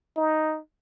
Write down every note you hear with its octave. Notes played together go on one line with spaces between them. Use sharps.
D#4